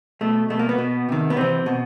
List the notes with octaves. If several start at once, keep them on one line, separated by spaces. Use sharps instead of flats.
B2 A3
B2 A3
A#3
B3
B2
C3 D#3
B3
C3 E3 C4
B2